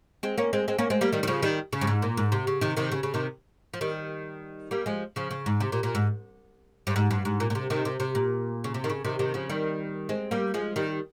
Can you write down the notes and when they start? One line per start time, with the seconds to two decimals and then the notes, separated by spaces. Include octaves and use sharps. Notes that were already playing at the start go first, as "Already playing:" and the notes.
0.23 G#3 C4
0.38 A#3 C#4
0.53 G#3 C4
0.68 G#3 C4
0.78 A#3 C#4
0.90 G#3 C4
1.01 G3 A#3
1.12 D#3 G3
1.23 D#3
1.27 C#3 F3
1.42 D#3 G3
1.73 C#3
1.81 G2
1.87 G#2
2.02 A#2
2.17 G#2
2.32 C3
2.47 C#3
2.61 C3 D#3
2.77 C3 D#3
2.92 C#3
3.03 C#3
3.14 C3 D#3
3.74 F3
3.81 D#3 G3
4.71 G3 A#3
4.86 F3 G#3
5.16 C#3 F3
5.31 C#3
5.46 G#2
5.60 C3
5.72 A#2
5.83 A#2
5.95 G#2
6.87 G2
6.96 G#2
7.11 G2
7.25 G#2
7.40 A#2
7.50 A#2
7.55 C3
7.70 C3 D#3
7.85 C3
8.00 C3
8.15 A#2
8.64 C#3
8.74 C3
8.84 D#3
8.89 C#3
9.05 C3 D#3
9.19 C3 D#3
9.34 C#3 F3
9.49 D#3 G3
10.09 G#3 C4
10.31 G3 A#3
10.54 F3 G#3
10.76 D#3 G3